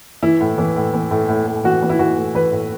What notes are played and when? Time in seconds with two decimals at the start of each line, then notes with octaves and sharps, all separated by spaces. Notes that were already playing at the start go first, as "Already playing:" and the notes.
0.23 E3 E4
0.41 A2
0.58 E3
0.76 A2
0.93 E3
1.11 A2
1.28 A2
1.47 A2
1.64 E3 F#4
1.82 E3
1.89 E4
1.99 E3 F#4
2.17 A2
2.35 E3 B4
2.52 A2